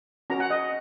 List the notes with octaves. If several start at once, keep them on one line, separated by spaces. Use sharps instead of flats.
C#4 F#4 A#4 A#5
F#5
D#5